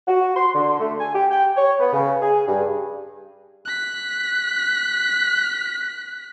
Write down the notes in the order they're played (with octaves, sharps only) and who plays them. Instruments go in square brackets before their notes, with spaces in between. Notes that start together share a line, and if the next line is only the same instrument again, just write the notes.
[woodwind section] F#4
C6
D3
A3
G#5
G4
G5
C#5
B3
C#3
G#4
G2
[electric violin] F#6 B6